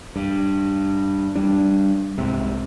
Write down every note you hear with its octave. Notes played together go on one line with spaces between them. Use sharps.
G2
G3 D4
C2 G#2 C3